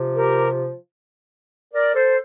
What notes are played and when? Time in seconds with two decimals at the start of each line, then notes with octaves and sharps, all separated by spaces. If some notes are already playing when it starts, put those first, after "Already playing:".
Already playing: C3 F3
0.15 G4 A#4
1.74 A#4 D5
1.94 A4 C5